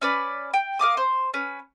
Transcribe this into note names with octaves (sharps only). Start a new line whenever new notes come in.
C#4 B4 D5
G5
A#4 F5 D6 D#6
C5
C#4 B4